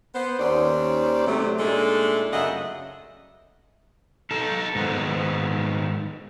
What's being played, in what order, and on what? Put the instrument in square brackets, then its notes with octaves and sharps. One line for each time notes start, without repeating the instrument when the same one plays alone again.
[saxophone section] B3 C5
D#2 D#3 C#4 C5 D5
C3 F#3 A3
A#2 G#3 A3 D4 D#4 A4
F#2 C#3 A3 D#5 E5 F#5
[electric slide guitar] D#4 A4
G#2 D#3 G#3 B3